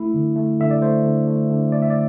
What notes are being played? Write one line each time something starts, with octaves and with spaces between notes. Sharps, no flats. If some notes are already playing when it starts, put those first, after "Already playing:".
Already playing: A3 E4
D3
A3
D3 E5
D5
A3 C5
D3
A3
D3
A3 D5
E5
D5